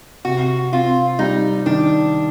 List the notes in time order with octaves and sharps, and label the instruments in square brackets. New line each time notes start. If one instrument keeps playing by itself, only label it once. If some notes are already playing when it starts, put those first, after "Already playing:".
[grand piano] C3 [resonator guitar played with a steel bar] F#4
[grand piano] C4 [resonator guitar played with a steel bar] F4
[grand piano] G3 [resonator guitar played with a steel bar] D#4
[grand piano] D#3 [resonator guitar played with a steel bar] D4